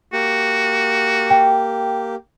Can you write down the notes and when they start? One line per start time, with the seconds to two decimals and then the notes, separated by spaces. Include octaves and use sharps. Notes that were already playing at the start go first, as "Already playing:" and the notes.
0.13 A#3 F#4 G4
1.30 G5